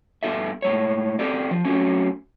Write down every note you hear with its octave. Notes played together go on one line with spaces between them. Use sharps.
G2 G3 B3 E4 A4 E5
A2 G#3 C#5
C4 G4 A4 D5
F3
F#3 A3 C4 C#4